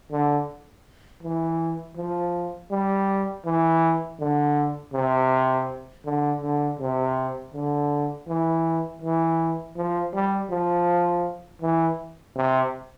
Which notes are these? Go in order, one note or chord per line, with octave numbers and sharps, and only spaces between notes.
D3
E3
F3
G3
E3
D3
C3
D3
D3
C3
D3
E3
E3
F3
G3
F3
E3
C3